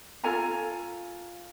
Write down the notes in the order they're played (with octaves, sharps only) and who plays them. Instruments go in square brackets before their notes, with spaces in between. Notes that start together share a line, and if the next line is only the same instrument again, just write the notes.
[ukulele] F4 A4 G#5 A#5